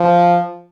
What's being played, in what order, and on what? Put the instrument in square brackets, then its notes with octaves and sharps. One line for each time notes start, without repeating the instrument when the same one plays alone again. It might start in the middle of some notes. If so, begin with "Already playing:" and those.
Already playing: [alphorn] F3